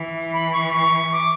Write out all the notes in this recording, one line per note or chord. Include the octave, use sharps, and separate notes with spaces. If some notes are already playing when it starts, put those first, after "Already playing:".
Already playing: E3
B5
C#6
C#6
D6